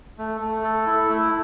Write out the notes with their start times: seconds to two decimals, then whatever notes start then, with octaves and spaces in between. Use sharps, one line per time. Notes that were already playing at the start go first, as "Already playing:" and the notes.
0.19 A3
0.41 A3
0.64 A4
0.86 E4
1.09 A3